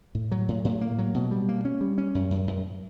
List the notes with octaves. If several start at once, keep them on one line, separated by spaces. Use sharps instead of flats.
A2
F#3
A2
A2
A#3
F#3
B2
G3
A#3
C#4
G3
C#4
F#2
F#2
F#2